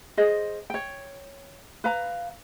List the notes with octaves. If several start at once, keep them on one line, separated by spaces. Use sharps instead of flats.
G#4 C5 D#5
C#5 G5
B4 F5 A#5